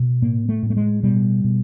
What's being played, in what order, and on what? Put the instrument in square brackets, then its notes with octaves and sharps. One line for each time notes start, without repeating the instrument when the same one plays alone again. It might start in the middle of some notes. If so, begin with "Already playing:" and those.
Already playing: [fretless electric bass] B2
A2 A#3
A3
A2
A3
G#3
B2 G3
B2